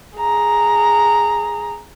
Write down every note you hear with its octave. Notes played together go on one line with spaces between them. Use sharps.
G#4 A#5